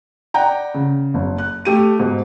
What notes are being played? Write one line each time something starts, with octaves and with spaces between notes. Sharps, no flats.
D5 F#5 G5 A#5
C#3
F#1
F#6
A3 G4 D#7
G#2 B2